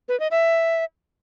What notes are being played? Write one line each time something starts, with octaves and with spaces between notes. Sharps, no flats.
B4
D#5
E5